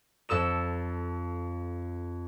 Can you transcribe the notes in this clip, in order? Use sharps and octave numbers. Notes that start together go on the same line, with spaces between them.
F2 A4 E6 E7